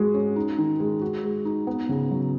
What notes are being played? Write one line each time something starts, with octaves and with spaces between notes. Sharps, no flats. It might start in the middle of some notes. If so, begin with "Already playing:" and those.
Already playing: G#3 F#4
C#4
D#4
D#3
G#3
F#4
G#3
D#4
B3
C#3
F#3